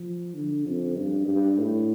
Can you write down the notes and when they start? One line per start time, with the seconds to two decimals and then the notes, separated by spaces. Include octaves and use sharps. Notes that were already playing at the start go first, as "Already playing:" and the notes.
Already playing: F3
0.34 D3
0.65 F2
0.96 G2
1.28 G2
1.58 A2